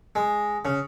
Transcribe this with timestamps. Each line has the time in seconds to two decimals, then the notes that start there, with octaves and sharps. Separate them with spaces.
0.15 G#3
0.65 C#3